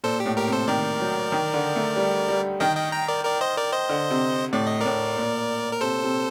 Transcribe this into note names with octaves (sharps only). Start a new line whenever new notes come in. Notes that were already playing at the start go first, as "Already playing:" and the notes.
A#2 A4 C5
G4
A2
G4 A#4
C3
A4 C5
D#3 A#4 D5
F#3
D#3
D3
A3
G3
G3
D#3 D#5 G5
D#5 G5
G5 A#5
A#4 D5
A#4 D5
C5 D#5
A#4 D5
C5 D#5
D3
C3
A2 D5
D#5
A2 A#4 D5
A#2
A#4
C3 A4 C5
C3